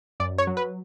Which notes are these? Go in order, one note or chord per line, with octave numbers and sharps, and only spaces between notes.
F#2 D5
C#5
F#3
B4